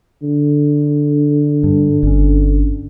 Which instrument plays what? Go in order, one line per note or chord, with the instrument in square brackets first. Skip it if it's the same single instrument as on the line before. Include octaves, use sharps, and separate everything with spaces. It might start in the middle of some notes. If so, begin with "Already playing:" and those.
[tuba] D3
[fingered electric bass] G2
G1 C#4